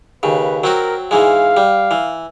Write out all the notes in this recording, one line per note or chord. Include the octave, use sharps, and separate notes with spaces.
D#2 C#3 B4
F#3 C4 F#4 A#4
G#2 E3 G#3 F5
G3
E3